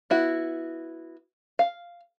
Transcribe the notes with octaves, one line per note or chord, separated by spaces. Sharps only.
B3 E4 F#4
F5